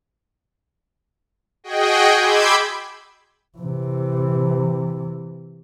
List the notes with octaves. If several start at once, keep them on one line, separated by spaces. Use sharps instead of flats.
F#4 G#4 D#5 G5
B5 C6 D6 E6 G6 G#6
C3 E3